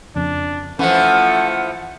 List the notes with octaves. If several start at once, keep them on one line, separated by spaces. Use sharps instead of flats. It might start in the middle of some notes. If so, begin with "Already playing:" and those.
F2 C#3 D4
E3 F3 A3 C#4 F#5